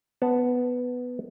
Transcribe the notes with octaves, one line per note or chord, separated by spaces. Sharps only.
B3 F#5 A5